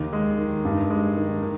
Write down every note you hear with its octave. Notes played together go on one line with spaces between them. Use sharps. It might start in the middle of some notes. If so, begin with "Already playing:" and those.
Already playing: D#2
G#3
D#3
G2
G#3
D#3
D#3